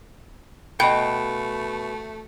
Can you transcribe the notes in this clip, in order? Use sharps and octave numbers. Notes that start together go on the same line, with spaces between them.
B2 A3 D#5 G5